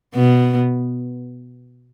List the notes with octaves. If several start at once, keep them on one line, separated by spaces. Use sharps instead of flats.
B2 B3